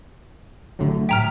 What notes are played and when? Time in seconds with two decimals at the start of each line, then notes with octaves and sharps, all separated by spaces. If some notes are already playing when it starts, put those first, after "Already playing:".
0.79 A1 D3 F#3 A3
1.09 A2 G5 A#5 F6 B6